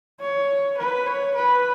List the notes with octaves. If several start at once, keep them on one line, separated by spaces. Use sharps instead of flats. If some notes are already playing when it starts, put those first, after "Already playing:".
C#5
B4
C#5
B4